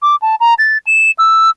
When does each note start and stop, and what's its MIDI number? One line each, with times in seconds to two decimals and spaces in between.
0.02 0.15 86
0.22 0.35 81
0.40 0.54 82
0.59 0.78 93
0.86 1.11 100
1.18 1.50 88